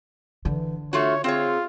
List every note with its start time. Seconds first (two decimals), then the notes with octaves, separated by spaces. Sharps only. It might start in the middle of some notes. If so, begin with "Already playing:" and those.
0.45 D3 E3
0.93 A3 D4 F4 F#4 C#5
1.24 C4 F4 G#4 C#5